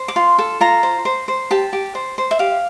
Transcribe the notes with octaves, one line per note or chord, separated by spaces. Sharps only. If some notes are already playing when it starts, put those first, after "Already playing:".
Already playing: C5
D6
F4 C6
A4
F4 A#5
C5
C5
C5
G4 A5
G4
C5
C5
E5
G4 F5